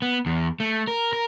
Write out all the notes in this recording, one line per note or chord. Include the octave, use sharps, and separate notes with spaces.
B3
E2
A3
A#4
A#4